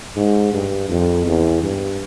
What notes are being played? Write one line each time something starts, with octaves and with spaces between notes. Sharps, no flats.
G#2
G2
F2
E2
G2